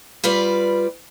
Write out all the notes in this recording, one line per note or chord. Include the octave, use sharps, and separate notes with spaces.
G3 F4 B4 D5